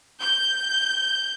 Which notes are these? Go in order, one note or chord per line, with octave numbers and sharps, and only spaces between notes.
G6